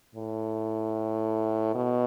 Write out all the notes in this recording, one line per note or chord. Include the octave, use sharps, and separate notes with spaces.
A2
B2